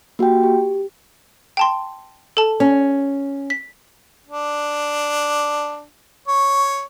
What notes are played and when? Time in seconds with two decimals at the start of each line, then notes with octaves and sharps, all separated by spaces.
0.19 A#3 F#4 G4 G5
0.43 G4
1.57 G5 A5 C6
2.37 A4 A5
2.60 C#4
3.50 B6
4.27 D4
6.28 C#5